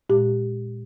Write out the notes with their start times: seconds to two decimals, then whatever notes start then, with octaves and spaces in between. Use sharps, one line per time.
0.09 A#2 G#3 G4